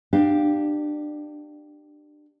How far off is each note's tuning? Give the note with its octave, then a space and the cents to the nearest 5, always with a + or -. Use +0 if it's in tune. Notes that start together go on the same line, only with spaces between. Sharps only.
D4 +25 G4 -5 F5 +0